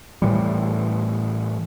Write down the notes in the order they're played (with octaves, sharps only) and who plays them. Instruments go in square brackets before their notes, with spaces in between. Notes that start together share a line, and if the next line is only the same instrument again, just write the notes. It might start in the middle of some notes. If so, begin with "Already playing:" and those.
[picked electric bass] A2 E3 G3